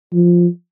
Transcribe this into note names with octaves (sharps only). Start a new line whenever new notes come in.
F3